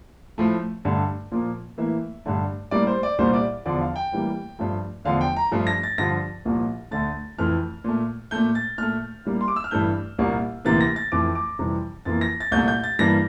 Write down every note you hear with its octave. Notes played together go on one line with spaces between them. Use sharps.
A2 F3 A3
G2 D3 A3
A#2 F3 A#3
A2 E3 A#3 E5
G2 D3 A3
A2 G3 A#3 D5
C5
D5
C2 A#2 G3 C5
D5
E2 D3 F3 D5
F5
G5
A2 E3 G3 A#3
G2 F3 A3
E2 D3 F3 A3 F5
G5
A#5
G2 F3 A3
A#6
A6
G2 D3 F3 A#6
C2 A#2 F3
D2 D3 A3 A6
F2 E3 A3 F6
A#2 A3
A#2 A3 G6
A6
A#2 A3 F6
A2 G3 A#3
C6
D6
E6
F6
G2 E3 A3 G6
C2 A#2 G3 A#3
D2 C3 E3 A#3 A6
A#6
A6
F2 E3 A3 D6
D6
F2 C3 E3 G3
F2 E3 A#3 A6
A#6
A6
C2 A#2 A3 G6
G6
A6
G2 E3 G3 A#3 A#6